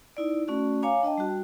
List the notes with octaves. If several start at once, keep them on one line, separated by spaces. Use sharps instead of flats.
D#4 E4 D5
A3 C#4 F#4 D5
C#5 F5 G#5 A#5 D6
D4 D#5 G5 A5
G3 F#4